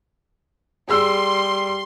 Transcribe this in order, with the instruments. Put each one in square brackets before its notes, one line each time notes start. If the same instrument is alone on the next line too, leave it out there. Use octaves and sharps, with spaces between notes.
[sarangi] G3 [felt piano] G#4 E6 [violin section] C6